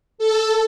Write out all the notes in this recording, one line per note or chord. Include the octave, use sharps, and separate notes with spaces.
A4